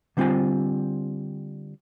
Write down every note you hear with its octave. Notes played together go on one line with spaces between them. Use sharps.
D3 G3 C4 F4 C5 G#5